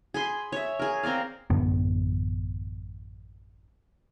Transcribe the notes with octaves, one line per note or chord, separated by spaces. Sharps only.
G#4 B5 C6
C#5 E5
G#4 A#4
C4 A#4 D5 F5
A1 F#2 D3 B3